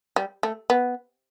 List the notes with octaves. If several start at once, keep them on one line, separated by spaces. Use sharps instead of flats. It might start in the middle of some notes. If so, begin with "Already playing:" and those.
G3
A3
B3